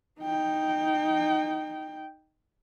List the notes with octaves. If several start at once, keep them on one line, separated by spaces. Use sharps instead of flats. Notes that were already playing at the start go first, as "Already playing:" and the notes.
D#4 G5